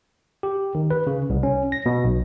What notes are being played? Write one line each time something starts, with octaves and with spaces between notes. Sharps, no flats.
G4
D#3
B4
C#3
C2
C#4
A#6
B2
B1